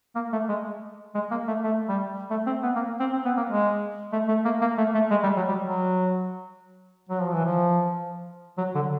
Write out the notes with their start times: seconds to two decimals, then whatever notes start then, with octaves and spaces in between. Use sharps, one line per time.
0.15 A#3
0.32 A3
0.49 G#3
1.15 G#3
1.31 A#3
1.47 A3
1.63 A3
1.89 G3
2.31 A3
2.46 C4
2.63 B3
2.76 A#3
3.00 C4
3.13 C4
3.25 B3
3.37 A#3
3.50 G#3
4.12 A3
4.28 A3
4.45 A#3
4.61 A#3
4.78 A3
4.94 A3
5.11 G#3
5.23 G3
5.36 F#3
5.48 G3
5.61 F#3
7.09 F#3
7.22 F3
7.33 E3
7.45 F3
8.58 F#3
8.75 D3